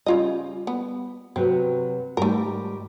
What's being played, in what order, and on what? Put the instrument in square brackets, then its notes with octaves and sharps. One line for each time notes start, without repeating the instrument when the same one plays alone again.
[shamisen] C#3 F4 D#5 [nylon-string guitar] G3
[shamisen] B3
[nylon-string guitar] C3 F#3 B4 [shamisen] C4
[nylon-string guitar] G#2 D#3 G3 [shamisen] A3 A#4